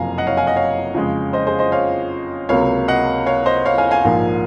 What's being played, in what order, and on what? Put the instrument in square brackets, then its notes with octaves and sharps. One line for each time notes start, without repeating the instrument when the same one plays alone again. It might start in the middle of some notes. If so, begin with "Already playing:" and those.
Already playing: [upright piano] F#1 F2 C3 F3 F5 G#5 A#5
D#5 F#5
C#5 F5
F5 G#5
D#5 F#5
C#5 F5
F2 C#3 G#3
C5 D#5
G#4 C5
C5 D#5
C#5 F5
C#2 C3 F#3 A#3 C#5 F5
D#5 F#5
C#5 F5
C5 D#5
C#5 F5
F5 G#5
F5 G#5
A#1 G#2 F3 A#3